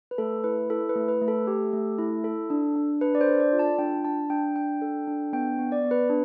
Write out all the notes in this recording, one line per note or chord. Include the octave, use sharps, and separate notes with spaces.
B4
A3 A4
E4 B4
E4 A4
B4
A3
B4
A3
A4
G4
A3
E4
A4
D4
D4
D4 B4
D5
C5
A4
D5
F4
A5
D4 G5
D4 A5
D4 G5
D4 G5
A4
D4
B3 G5
B3
D5
B3
B4
D4